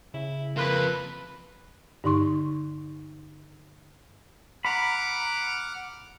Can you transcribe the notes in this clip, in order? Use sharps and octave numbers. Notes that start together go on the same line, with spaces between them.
C#3 E4
F2 A#3 F4 B4
G2 D3 D#4 C6 C#6
F#5 A#5 B5 D6 F6